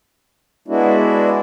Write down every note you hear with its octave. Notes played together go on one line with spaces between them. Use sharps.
G#3 B3 D4 E4 F#4